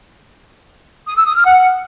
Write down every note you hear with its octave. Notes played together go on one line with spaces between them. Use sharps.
D#6
E6
D#6
F6
F#5